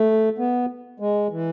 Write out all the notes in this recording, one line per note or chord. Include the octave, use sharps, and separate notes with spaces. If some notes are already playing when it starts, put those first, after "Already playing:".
Already playing: A3
B3
G#3
E3